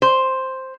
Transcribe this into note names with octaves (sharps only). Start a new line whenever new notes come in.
C5